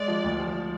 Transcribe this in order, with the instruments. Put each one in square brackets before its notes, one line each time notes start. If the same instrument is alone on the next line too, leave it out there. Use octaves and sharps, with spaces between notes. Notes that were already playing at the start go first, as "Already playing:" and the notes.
Already playing: [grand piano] G#3 [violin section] D5
[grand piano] F3
D2
F3